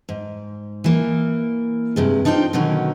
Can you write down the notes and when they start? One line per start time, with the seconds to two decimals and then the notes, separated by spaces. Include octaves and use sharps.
0.09 G#2
0.84 E3 A#3
1.96 G2 C3 G#3
2.25 D4 D#4 F4 C5 G5
2.53 B2 D3 D#3 F#3 C#4